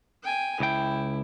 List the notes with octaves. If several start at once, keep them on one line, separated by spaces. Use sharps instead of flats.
G5 G#5
C#2 E4 G5